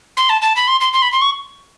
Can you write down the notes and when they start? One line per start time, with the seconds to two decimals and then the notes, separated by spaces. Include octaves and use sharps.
0.17 C6
0.29 A5
0.41 A5
0.55 B5
0.67 C6
0.80 C6
0.93 C6
1.02 B5
1.12 C6
1.21 C#6